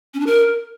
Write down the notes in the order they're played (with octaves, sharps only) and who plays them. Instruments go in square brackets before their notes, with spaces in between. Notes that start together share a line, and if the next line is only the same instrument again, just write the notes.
[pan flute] C#4
D4
A#4